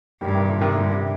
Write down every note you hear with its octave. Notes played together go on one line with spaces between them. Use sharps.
G2 D#3 G3
C3 D#3
A#2 D3
C3 D#3
G2 A#2 D3
C3